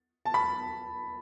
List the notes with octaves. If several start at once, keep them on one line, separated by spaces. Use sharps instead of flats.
A5
B5